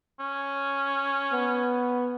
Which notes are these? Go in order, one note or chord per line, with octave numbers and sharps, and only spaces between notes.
C#4
B3